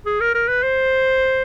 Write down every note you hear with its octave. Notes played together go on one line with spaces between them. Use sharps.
G#4
A#4
A#4
B4
C5